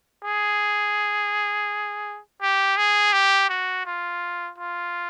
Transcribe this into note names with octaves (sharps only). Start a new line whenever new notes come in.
G#4
G4
G#4
G4
F#4
F4
F4